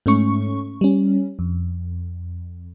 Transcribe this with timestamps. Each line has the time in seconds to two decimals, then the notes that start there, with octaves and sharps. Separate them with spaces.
0.06 G#2 A3 C#4 C#6
0.81 G3 C#4
1.39 F2